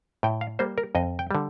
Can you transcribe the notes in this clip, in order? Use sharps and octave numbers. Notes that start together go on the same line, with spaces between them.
A2 G5
F5
G3 A#3 C5
A#4
F2 D#5
G5
D3 G3